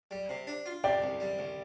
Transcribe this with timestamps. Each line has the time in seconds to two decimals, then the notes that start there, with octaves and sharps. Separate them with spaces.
0.11 G3
0.29 C3
0.47 D4
0.66 F4
0.84 C3 D5 G5
1.02 C2
1.20 G3
1.39 C2